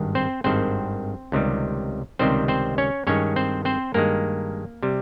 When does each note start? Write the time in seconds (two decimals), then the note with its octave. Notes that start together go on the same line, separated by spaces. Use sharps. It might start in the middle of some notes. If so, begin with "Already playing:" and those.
Already playing: G#1 G2 D#3
0.15 C4 C5
0.44 G#1 G2 D#3 C4 C5
1.32 C#2 C3 D#3 G3
2.19 C#2 C3 D#3 G3 C4 C5
2.48 C4 C5
2.78 C#4 C#5
3.07 G2 D#3 G#3 C#4 C#5
3.36 C4 C5
3.65 C4 C5
3.94 G2 D#3 G#3 A#3 A#4
4.83 C3 G3